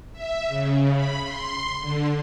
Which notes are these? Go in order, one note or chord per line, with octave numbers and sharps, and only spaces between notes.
E5
C#3
B5
C6
D3